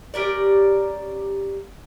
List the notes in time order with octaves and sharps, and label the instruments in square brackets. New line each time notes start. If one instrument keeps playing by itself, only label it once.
[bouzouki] C#4 G4 A#4 D5